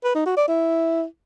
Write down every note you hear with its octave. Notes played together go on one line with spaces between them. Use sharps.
B4
D#4
F#4
D5
E4